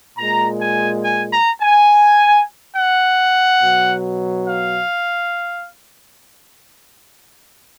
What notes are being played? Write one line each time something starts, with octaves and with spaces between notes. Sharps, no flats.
A#2 G#3 A#5
G#5
G#5
A#5
G#5
F#5
B2 F#3
F5